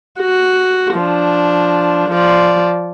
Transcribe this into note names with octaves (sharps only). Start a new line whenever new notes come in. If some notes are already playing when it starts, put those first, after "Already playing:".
F#4
F3 D4
F3 D5